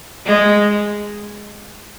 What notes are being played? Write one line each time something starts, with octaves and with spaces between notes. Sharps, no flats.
G#3